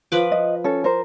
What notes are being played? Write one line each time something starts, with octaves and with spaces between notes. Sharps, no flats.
F3 B4 D6
D#5
C#4 A4
A#4 C5